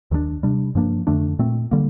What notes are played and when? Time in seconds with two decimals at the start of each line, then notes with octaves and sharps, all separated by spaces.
0.11 D#2 D#3 G3 D4
0.43 C3 G3 D4
0.75 G2 F3 A#3 D4
1.07 F2 D3 A3 D4
1.39 A#2 A3 C4
1.71 D3 G3 A#3